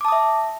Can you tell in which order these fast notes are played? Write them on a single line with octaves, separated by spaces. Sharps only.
D6 A5 D#6 E5